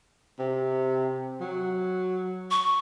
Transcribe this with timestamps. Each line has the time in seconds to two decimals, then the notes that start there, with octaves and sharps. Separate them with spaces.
0.39 C3
1.41 F#3
2.51 C#6